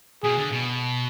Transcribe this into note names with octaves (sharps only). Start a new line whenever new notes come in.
B2 G#4
D3
B2